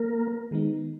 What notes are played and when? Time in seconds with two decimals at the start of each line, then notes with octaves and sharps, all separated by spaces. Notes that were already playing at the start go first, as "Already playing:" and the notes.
Already playing: A#3 A#4
0.51 D#3 G#3 B3 D#4